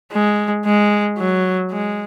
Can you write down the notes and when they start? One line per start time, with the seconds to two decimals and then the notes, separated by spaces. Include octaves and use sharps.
0.12 G#3
0.65 G#3
1.19 F#3
1.71 G#3